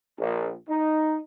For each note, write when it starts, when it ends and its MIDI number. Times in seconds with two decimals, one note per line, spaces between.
0.19 0.52 34
0.67 1.16 63